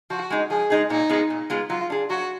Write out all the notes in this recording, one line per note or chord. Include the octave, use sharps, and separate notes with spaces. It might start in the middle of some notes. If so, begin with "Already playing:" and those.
F3 F#4
G#3 D#4 G#4
F3 G#4
G#3 D#4 G#4
A#2 D#4
G#3 B3 F4 G#4
A#2
G#3 B3 F4 G#4
F#3 F4
D4 G#4
F#3 F#4